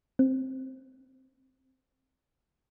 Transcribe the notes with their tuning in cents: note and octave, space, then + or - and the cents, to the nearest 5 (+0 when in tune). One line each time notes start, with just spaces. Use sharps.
C4 +5